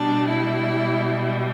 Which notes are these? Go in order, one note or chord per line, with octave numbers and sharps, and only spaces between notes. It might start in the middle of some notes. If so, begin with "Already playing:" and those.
Already playing: B2 G3 D4
E4